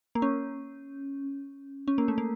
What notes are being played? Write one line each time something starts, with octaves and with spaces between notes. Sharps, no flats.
A#3
C#4
C#4
A#3
A3
A#3